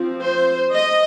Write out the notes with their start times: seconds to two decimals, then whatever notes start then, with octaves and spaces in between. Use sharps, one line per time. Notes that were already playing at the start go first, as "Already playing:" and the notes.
Already playing: F3 C4
0.22 C5
0.73 D#5